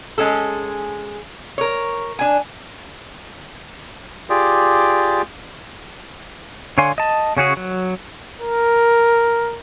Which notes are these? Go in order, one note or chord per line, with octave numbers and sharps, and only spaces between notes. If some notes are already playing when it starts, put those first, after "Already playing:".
G#3 C#4 G#4 A4
A#4 C#5
D4 G#5
F4 G4 G#4 D5
D3 C#5 F5 G#5 C6
D#5 A5
C#3 C#4 F#4 G#4
F#3
A#4